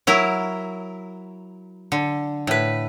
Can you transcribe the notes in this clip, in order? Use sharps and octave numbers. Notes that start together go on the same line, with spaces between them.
F#3 E4 A#4
D3
A2 B4